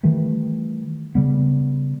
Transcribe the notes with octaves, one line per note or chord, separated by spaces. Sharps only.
D#3 E3 G3 A3
C#3 G3 B3